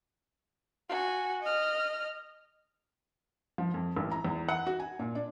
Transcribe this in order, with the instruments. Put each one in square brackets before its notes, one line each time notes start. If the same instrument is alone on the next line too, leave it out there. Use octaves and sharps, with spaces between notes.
[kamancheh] F#4 G#5
D#5 F6
[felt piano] F3
F2
A1
A#5
E2
F#5
F#4
G#5
A#2
D4